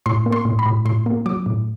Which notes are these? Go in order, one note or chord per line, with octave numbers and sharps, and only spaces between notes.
A2 C6
A#3
C6
A2
B5
A2
A2 C6
A#3
F#3 D6
A2